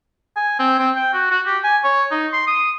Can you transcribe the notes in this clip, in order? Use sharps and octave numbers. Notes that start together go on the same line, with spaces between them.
G#5
C4
C4
G5
F#4
F#4
G4
G#5
C#5
D#4
C6
D#6